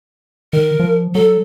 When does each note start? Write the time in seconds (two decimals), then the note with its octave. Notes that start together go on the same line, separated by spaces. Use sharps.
0.53 D#3 A#4
0.80 F3
1.15 F#3 A4